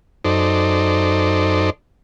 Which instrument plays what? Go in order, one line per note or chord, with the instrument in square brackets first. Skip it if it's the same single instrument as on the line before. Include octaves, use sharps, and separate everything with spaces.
[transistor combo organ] F#2 D#4 A4 C5 D5